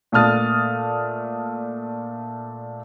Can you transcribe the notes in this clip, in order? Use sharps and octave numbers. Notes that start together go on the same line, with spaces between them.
A#2 A3 D4 D#6 F6 A6